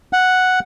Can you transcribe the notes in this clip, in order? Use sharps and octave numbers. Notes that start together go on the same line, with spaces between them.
F#5